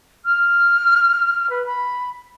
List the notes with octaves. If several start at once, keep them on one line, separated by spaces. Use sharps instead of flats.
F6
B4
B5